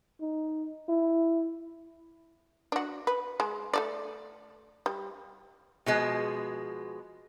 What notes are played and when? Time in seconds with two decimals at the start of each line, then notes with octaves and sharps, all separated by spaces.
0.21 D#4
0.89 E4
2.72 D4 F#4
3.07 B4
3.40 G#3
3.74 A3 A4 D5
4.86 G3
5.86 B2 F3 G#3